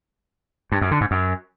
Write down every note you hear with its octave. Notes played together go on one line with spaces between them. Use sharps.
G2
F#2
D3
G#2
F#2